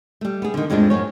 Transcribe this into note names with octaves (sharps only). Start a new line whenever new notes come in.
G3 A3
B3 G#4
D3 D#3
F2 A2 F3 G#3 D4
F#2 C#5